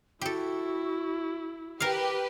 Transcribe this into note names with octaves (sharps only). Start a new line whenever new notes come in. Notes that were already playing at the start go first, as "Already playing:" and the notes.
E4 F#4 G4 A4
G4 A#4 B4 F5